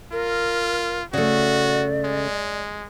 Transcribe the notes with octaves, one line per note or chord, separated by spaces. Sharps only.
F4 A#4
C#3 A3 F#4 D5
G#3